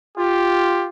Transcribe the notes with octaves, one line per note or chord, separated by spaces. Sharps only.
F4 G4